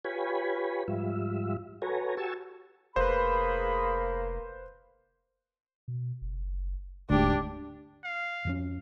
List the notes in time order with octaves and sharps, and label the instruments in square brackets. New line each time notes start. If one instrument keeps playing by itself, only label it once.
[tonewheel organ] F4 G4 B4 C#5 G#5 B5
G#2 F3 G3 F4 E5
F#4 A4 B4 C#5 G#5 A#5
F#4 G4 G#5 A5 C#6 E6
[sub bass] F1 [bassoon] A#3 [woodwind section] G#4 B5 [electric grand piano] B4 C5
[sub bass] B2
F#1
[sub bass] D#1 [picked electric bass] D2 G#2 [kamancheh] D4 G4
[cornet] F5
[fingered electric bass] F2 F3 C#4